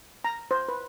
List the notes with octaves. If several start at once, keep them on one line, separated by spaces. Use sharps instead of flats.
A#5
C5
B4